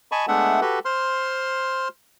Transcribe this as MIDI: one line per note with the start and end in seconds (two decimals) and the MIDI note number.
0.12 0.26 75
0.12 0.26 80
0.12 0.26 81
0.12 0.26 83
0.12 0.26 85
0.28 0.60 56
0.28 0.60 57
0.28 0.60 59
0.28 0.60 62
0.28 0.60 76
0.28 0.60 78
0.61 0.79 66
0.61 0.79 67
0.61 0.79 69
0.61 0.79 71
0.85 1.88 72
0.85 1.88 84
0.85 1.88 89